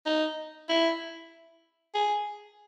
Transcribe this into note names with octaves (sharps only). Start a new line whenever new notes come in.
D#4
E4
G#4